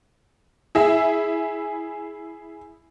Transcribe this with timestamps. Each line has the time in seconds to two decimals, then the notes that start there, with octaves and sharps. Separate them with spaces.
0.75 E4 G#4 E5